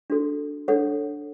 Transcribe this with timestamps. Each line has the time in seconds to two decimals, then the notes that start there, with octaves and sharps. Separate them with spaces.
0.10 D4 F#4 A4
0.68 D4 A4 C#5 F#5